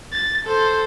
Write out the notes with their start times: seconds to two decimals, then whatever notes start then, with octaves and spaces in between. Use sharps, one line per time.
0.13 A6
0.45 A4 C5